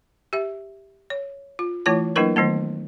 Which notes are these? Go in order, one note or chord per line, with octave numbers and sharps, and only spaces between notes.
G4 E5
C#5
F4
E3 A3 E4 F4 C#5 A5
F#3 A#3 D4 E4 A#4 B4
D#3 F#3 A3 B3